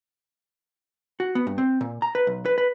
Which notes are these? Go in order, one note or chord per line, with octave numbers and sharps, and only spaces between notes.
F#4
B3
G2
C4
A#2
A#5
B4
B1
B4
B4